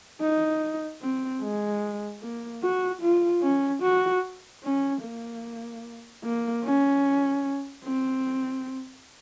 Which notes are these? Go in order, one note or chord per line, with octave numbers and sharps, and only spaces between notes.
D#4
C4
G#3
A#3
F#4
F4
C#4
F#4
C#4
A#3
A#3
C#4
C4